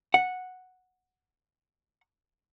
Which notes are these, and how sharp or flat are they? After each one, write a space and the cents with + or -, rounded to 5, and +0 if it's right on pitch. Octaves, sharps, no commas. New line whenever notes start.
F#5 -5